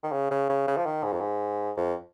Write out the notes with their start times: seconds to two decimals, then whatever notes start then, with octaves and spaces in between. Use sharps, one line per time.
0.04 D#3
0.12 C#3
0.31 C#3
0.50 C#3
0.68 C#3
0.77 F3
0.86 D#3
1.04 G#2
1.12 F2
1.20 G#2
1.77 F2